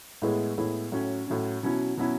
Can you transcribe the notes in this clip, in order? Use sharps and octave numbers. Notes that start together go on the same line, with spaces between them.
A2 G#3 B3 E4 G#4
A2 G#3 B3 E4 G#4
A2 F#3 C#4
A2 F#3 C#4
B2 F#3 C#4 E4
B2 F#3 C#4 E4